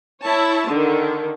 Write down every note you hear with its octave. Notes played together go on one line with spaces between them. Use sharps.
E4 C#5 A5
D3 D#3